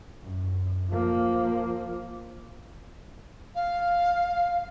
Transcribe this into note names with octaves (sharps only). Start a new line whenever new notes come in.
F#2
F3 A#3
F5